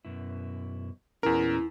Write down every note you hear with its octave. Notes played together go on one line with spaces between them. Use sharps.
F#2 B2 E4
E2 A#2 C#4 E4 A#4